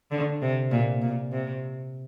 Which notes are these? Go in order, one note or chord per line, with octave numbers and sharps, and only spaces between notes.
D3
C3
A#2
A#2
C3